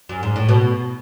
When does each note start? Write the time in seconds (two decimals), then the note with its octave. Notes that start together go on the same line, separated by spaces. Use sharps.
0.09 F#2
0.23 G#2
0.36 A2
0.49 B2